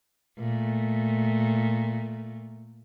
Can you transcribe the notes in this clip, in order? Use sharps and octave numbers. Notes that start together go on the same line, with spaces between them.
A#2 A3